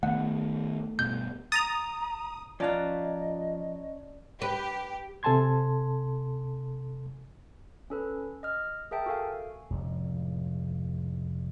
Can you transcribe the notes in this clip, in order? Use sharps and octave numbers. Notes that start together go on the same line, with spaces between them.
D#3 A3 B3 F#5
G2 B2 G6
A#5 D#6 A6 A#6 F7
F3 C#4 F4 D5 D#5 A5 A#5 F#6
G4 B4
C3 A4 G#5 A5 C6 G#6
C#4 A4 B4
D#5 F6
G#4 A#4 E5 G5 A5
F#4 A4 F5 G#5
F1 C#2 A2